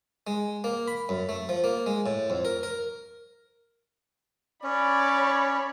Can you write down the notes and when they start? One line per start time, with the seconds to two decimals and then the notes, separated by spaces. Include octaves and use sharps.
0.27 G#3
0.64 A#3
0.88 B5
1.09 F#2
1.29 A3
1.49 F3
1.64 A#3
1.86 G#3
2.06 A2
2.30 F2
2.45 A#4
2.63 A#4
4.64 C#4 C#5 D5 B5